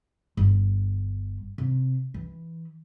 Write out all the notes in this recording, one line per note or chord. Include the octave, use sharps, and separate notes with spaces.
G1
C3
E3